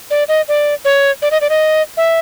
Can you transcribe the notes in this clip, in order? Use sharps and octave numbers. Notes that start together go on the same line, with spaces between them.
D5
D#5
D5
C#5
D5
D#5
D5
D#5
E5